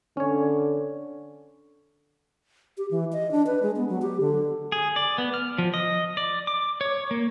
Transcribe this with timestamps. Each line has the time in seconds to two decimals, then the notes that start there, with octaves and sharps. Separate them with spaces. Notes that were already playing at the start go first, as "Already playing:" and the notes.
0.17 D3 C#4 C#5
2.78 G4
2.91 E3
3.13 D#5
3.31 D4
3.46 B4
3.63 G#3
3.76 B3
3.89 F#3
4.02 G4
4.21 D3
4.72 G#4
4.96 D5
5.18 B3
5.34 F6
5.58 F3
5.74 D#5
6.17 D5
6.47 D6
6.81 C#5
7.11 A#3